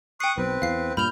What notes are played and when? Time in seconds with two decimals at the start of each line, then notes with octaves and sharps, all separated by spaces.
0.20 G5 C#6 D#6 F#6 C7
0.38 B1 C4 B4
0.62 E2 F5 C7
0.97 G2 A#2 B5 F6 G6 F7